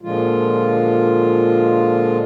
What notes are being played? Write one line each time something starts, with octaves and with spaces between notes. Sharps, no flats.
A#2 D3 F3 G#3 F4